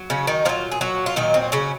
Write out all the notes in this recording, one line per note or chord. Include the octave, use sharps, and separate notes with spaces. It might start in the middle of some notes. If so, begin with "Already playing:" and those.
Already playing: F#3
C#3 C#4
D#3 D#4
A#2 F3 F#3 F4
G#4
F#3 F#4
F4
A#2 D#3 F#3 D#4
C4
C#3 C#4